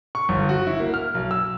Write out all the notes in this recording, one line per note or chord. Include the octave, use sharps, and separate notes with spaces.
C#6
G1
F#4
E4
A#3
F6
B1
E6